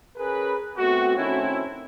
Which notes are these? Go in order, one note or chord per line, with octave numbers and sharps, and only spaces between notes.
C#4 G#4 A#4 B4
A3 B3 C4 F#4
D#3 A3 C4 C#4 E4